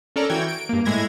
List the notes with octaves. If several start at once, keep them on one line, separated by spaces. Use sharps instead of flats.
C#4 A4 A#4 D5 A#5
E3 F#4 G5 G#6
D7
G2 A#3
A2 G#3 E4 G#6 A#6